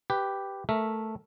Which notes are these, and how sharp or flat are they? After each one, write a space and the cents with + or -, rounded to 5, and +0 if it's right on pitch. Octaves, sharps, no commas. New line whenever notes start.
G4 +0 B4 +5
A3 +0 A#4 +0 E5 +0